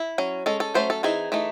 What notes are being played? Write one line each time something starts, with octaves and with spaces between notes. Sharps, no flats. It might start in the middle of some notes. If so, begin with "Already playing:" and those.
Already playing: E4
F#3 C#4
G#3 C#4 A4
A4
F#3 A3 C#4 C5
A4
E3 C4 D#4 G#4
E3 A3 D#4